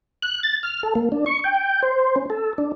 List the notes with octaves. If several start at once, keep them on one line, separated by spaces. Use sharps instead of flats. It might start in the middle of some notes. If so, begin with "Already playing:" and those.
F#6
A6
F6
A4
A#3
D4
C#6
G5
C5
C#4
A4
D4